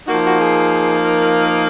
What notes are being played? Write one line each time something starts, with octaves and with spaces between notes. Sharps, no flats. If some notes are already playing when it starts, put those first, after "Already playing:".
F3 A#3 D#4 F#4
F#4
G#4
A#4